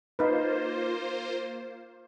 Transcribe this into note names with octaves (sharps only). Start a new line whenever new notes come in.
A#3 D#4 F4 B4 C5